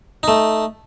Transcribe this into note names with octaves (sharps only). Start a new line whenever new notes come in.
A3 D#4